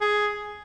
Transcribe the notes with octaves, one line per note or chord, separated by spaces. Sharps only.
G#4